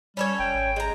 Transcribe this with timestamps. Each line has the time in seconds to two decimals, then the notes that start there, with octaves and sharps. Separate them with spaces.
0.17 G3 C#4 A4 C#5
0.39 F1 G5
0.55 G#1
0.76 G#3 A#5